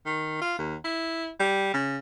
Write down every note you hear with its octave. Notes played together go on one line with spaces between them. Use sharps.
D#3
F4
D#2
E4
G3
C#3